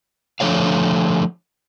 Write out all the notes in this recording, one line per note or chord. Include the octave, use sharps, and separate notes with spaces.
D3 F3 A3 C#5 F5